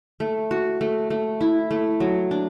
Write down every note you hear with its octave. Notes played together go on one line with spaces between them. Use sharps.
A3
F#4
A3
A3
E4
A3
F#3
D4